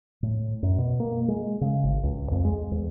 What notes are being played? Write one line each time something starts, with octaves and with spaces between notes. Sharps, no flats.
A2
F#2
B2
A#3
G#3
C#3
G#1
C#2
F2
G#3
E2